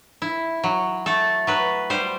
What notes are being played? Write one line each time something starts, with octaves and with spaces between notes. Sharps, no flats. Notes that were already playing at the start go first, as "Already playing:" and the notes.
E4
F#3
A3 A4
F#3 B4
G3 C5